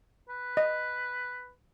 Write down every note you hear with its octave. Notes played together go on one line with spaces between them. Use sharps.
B4
D#5